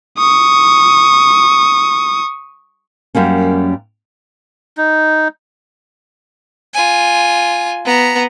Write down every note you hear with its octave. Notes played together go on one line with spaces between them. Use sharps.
C#6 D#6
F#2 G3 A#3 C#4
D#4
F4 G#5
B3 A#5